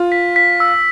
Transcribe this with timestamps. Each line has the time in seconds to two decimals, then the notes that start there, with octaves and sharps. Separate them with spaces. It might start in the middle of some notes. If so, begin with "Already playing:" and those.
Already playing: F4
0.12 B6
0.36 B6
0.60 E6